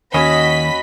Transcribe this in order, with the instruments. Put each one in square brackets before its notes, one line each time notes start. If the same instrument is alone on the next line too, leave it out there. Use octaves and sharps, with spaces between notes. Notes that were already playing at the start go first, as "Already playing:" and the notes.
[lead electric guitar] D#2 [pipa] C#4 [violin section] F#4 B5 B6 [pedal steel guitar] D#5